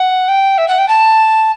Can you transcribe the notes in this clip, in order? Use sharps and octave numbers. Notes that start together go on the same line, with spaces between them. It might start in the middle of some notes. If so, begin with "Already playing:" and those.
Already playing: F#5
G5
E5
F#5
G5
A5